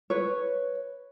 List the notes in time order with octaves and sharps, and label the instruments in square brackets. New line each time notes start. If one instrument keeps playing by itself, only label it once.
[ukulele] B4 C#5